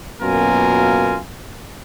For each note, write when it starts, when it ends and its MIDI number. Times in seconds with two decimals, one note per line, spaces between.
0.22 1.18 42
0.22 1.18 47
0.22 1.18 58
0.22 1.18 65
0.22 1.18 70
0.22 1.18 80